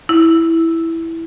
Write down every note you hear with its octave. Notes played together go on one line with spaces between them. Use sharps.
E4